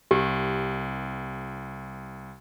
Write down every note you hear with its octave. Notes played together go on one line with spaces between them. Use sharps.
C2 G4